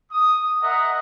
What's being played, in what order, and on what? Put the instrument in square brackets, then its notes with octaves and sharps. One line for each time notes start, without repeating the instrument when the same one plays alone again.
[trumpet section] D#6
A#4 D#5 E5 F#5